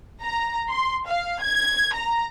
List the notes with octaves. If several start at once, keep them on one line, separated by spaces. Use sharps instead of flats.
A#5
C6
F5
G#6
A#5